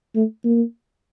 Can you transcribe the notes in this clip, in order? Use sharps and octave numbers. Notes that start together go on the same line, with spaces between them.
A3
A#3